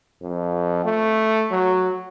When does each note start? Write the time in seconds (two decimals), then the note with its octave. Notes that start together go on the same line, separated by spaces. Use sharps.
0.22 F2
0.85 A3
1.51 F#3